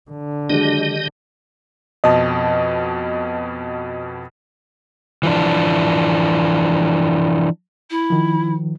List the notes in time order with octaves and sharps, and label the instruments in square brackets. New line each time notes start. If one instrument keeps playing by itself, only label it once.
[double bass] D3
[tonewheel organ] D#3 G4 D#5 [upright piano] F#3 G#3 D4
[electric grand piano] F2 B2 [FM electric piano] D#5 A5
[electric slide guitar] E3 F3 D4
[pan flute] E4
[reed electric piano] D#3 F3